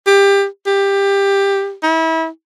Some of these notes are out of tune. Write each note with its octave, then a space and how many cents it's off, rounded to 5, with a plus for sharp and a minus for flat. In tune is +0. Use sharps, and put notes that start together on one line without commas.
G4 +20
G4 +15
E4 -30